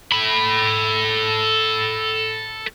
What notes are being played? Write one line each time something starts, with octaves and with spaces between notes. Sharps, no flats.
A4 B5